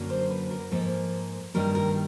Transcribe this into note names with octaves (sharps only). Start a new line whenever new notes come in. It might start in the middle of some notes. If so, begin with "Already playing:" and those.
Already playing: F#2 D3 F#3 A#3
C5
B4
A#4
G#2 F3 A#3 A4
G2 D#3 G3 A#3 A#4
A#4